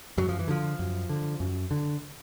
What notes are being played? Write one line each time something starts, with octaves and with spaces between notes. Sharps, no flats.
F#2 F#3
F3
E3
D3 F3
F#2
D3
F#2
D3